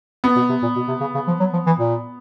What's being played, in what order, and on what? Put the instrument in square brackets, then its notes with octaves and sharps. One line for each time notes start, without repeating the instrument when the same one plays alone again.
[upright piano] B3
[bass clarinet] B2
C3
A#2
B2
C3
C#3
C#3
F3
F#3
F3
E3
A#2